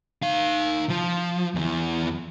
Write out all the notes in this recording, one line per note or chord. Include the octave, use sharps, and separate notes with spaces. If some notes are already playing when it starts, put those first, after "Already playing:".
D#4 F5
F3
E2 E3